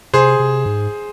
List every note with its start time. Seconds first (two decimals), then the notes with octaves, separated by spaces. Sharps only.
0.13 C3 G#4 C5
0.39 C3
0.66 G#2